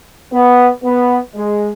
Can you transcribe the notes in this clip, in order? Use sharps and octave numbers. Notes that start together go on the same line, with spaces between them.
B3
B3
G#3